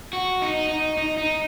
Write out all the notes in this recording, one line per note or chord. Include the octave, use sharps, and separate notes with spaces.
F#4
D#4
D#4
D#4
D#4